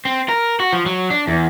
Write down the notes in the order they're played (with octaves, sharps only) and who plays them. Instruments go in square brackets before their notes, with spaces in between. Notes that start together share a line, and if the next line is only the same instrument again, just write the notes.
[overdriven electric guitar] C4
A#4
F#4
F3
F#3
D4
E2